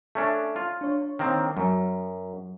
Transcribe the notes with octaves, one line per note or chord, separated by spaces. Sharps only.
A3 C#4 D4
F4
D4 C#5
D#3 A#3 C4
F#2 F#3